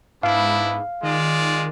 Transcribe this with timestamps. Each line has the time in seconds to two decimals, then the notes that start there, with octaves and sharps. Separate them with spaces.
0.23 G#2 B3 D4 E4 F5
1.03 D#3 G#3 F4 D5